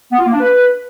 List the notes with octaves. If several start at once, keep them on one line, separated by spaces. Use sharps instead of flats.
B3
F4
A#3
D4
B4